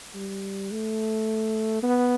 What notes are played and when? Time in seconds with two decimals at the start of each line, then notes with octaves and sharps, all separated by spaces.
0.15 G3
0.71 A3
1.83 B3